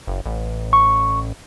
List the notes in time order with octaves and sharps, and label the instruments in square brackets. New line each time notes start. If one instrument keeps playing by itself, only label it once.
[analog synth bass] F#1
A1
[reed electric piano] C#6